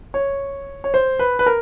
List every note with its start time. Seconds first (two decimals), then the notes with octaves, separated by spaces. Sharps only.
0.14 C#5
0.84 C#5
0.94 C5
1.19 B4
1.39 B4
1.46 A#4